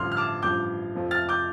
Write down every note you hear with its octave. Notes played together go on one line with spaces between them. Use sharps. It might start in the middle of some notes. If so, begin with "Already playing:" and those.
Already playing: A1 G2 D3 F3 C6 F6
F6
A5 D6
A1 G2 F3 D6 G6
F1 F2 F3
F6 A6
D6 G6